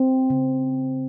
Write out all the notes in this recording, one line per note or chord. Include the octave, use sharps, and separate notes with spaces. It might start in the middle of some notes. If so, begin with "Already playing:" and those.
Already playing: C4
C#3